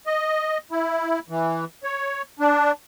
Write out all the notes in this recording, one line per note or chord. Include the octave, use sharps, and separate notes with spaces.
D#5
E4
E3
C#5
D4